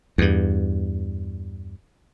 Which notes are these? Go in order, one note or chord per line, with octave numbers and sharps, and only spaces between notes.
E2 G2